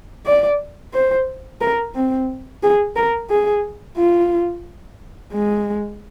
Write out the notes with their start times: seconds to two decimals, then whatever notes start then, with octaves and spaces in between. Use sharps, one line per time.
0.26 D5
0.93 C5
1.61 A#4
1.95 C4
2.63 G#4
2.96 A#4
3.30 G#4
3.98 F4
5.33 G#3